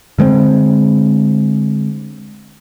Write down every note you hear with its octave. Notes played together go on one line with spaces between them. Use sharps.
D3 G#3 A3 C4